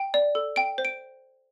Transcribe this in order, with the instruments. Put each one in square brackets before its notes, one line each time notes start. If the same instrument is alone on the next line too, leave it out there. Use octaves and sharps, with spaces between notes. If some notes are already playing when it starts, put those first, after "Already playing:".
Already playing: [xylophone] G5
D5
A4
G5 D7
C5
D7